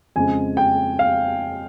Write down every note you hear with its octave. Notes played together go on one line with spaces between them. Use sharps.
F2 C#3 G#3 G#5
G5
F5